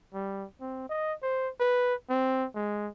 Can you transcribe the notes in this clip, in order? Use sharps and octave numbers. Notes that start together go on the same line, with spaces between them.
G3
C4
D#5
C5
B4
C4
G#3